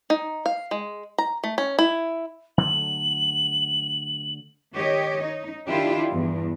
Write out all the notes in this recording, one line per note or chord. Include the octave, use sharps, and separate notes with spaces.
D#4
F5
G#3
A#5
A3
C#4
E4
D3 F#3 A3 F#7
D#3 G4 C#5 D#5
D#4
D#3 D4 E4 F4 G4
E2 G2